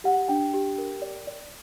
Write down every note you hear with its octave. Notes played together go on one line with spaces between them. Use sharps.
G4 F#5
D4 G5
G4
A#4
D5
D5